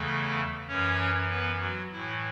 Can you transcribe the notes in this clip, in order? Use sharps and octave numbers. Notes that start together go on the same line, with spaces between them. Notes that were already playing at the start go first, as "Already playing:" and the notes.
Already playing: E2 C#3 E3 A3 A4
F#2 E3 C#4 C#5
B3 B4
F#3 F#4
A2 E3 E4